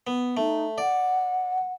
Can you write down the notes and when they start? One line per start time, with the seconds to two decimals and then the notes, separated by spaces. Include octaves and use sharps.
0.07 B3
0.37 A3 D#4
0.78 D5 F#5